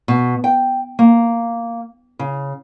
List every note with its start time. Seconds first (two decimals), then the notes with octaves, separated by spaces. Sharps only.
0.08 B2
0.44 G5
0.99 A#3
2.19 C#3